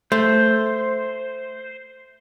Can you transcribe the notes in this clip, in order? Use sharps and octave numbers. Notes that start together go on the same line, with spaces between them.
A3 C5